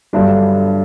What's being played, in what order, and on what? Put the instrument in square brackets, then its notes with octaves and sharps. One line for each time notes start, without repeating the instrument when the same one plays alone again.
[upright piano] G1 G2 D3 F#3 D4